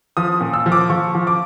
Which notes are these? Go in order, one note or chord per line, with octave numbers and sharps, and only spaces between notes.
F3 D#6
A#2
E6
F3
D6
F3 C#6
F3
D6